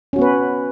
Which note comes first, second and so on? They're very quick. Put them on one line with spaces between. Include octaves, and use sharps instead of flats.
C#4 F#4 B3 B4